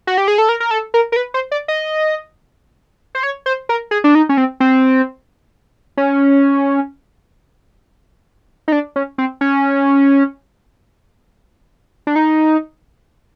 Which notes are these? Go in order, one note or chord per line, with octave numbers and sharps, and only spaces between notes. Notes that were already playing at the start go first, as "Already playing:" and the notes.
F#4
G4
G#4
A4
A#4
A#4
A4
A#4
A#4
B4
C5
D5
D#5
C5
C#5
C5
A#4
G#4
D4
D#4
C#4
C4
C4
C#4
D#4
D4
C#4
C4
C#4
D4
D#4